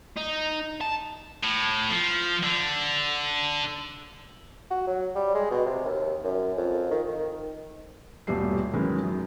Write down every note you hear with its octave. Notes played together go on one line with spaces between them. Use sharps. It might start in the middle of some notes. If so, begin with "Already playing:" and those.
D#4
A5
A2
F3
D3
F#4
F#3
G3
G#3
B2
C3
D#2
F#2
F2
D#3
D#3
D#1 G2 B2 G3 A3 C7
D#3 E3 F#3 G#3 C#4 E4
F#2